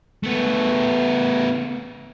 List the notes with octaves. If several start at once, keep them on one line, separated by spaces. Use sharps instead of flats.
A3 B3